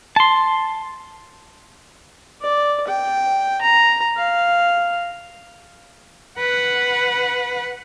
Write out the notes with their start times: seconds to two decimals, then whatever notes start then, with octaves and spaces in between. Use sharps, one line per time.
0.16 A5 C6
2.42 D5
2.87 G5
3.61 A#5
4.17 F5
6.39 B4 F#5